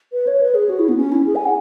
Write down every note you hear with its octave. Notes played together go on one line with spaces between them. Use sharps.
B4
C#5
B4
G#4
F#4
E4
B3
C#4
E4
G#4
G#5
F#5